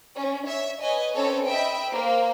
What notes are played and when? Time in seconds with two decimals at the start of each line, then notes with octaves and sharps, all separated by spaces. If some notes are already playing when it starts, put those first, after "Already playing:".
0.15 C#4
0.47 C#5 E5
0.80 B4 C#5 D#5 G#5
1.13 C4 C#4 A4 B4 C#5
1.48 D#5 E5 G5 B5
1.88 A#3 C5